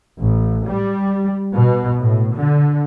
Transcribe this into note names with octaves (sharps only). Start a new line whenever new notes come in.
A1
G3
B2
A2
D3